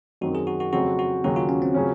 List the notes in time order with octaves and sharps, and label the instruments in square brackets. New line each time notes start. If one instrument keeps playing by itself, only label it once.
[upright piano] F#2 D#3 F#3 C4 D#4 [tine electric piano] F#4
[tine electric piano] G#4
F#4
F#4
[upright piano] F2 C#3 F#3 C4 [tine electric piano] F#4
[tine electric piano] F#4
[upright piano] D#2 C#3 F#3 [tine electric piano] F#4
[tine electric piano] F4
C#4
C4
[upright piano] C#3 F#3 C#4